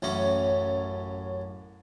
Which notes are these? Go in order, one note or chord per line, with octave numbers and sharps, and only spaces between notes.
A1 F#2 C#4 A#5